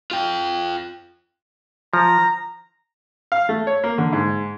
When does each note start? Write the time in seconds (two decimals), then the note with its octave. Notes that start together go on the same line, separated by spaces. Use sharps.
0.11 F4 G5
1.94 F3 A#5
3.32 F5
3.49 A3
3.67 C#5
3.84 A#3
3.98 D3
4.13 G#2